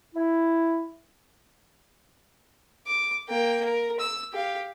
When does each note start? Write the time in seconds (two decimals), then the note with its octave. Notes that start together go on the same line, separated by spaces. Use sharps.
0.15 E4
2.87 D6
3.29 A#3 G5
3.65 A#4
4.00 E6
4.33 G4 F5